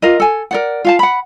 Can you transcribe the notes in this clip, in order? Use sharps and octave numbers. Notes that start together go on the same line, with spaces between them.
F4 A#4 D#5
A4 G#5
A#4 D5 F#5
F4 F5 A5
F#5 B5